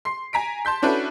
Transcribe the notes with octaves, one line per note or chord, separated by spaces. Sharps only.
C6 C7
G#5 A#5 B6 D7
A5 C6 G6 B6
C#4 D4 E4 F#4 A4 B4